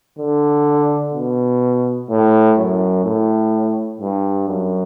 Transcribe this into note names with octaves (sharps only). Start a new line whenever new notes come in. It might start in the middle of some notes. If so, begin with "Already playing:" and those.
D3
B2
A2
F#2
A2
G2
F#2